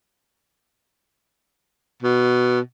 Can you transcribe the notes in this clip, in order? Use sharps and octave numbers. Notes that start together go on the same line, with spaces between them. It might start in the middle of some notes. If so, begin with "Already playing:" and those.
B2